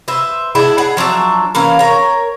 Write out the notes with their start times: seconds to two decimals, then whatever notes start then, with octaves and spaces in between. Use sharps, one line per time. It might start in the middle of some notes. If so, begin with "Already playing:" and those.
0.08 B4 C5 E5
0.55 G#3 B3 D4 E4
0.78 G#4 F#5
0.97 F3 F#3 D4 E5
1.55 E3 A#3 C#4 F5
1.79 A#4 C#5